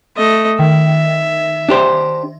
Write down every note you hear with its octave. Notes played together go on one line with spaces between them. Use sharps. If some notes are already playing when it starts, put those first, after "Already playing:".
A3 D#5
D#3 E5
D4 G4 C5